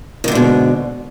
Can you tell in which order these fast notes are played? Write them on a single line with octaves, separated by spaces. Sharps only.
D#3 D3 G#2 B2